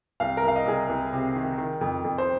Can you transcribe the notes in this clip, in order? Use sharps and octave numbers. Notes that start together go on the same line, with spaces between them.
C2 F5
A#4
C2 F5
D#5
C2 G#4
A#4
C2
C3
D#3
D#3
F2
F2
C5